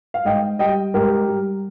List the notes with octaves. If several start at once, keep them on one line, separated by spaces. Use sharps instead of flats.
F5
G#2 D#5 G5
G3 D#5 G5
G#2 G4 A#4
G3